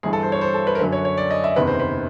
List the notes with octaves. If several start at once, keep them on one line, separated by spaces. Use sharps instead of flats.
G1 G2 E3 G#4
A4
C5
C#5
C5
A4
B4
A#4
F#2 D3 F#3 B4
C#5
C#5
D5
D#5
E5
F#1 E2 C3 D#3 B4
C5
B4